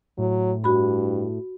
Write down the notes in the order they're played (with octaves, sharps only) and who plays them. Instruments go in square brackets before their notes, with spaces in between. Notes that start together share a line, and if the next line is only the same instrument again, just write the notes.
[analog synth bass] A2 [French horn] F#3
[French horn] G2 [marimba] F#4 B5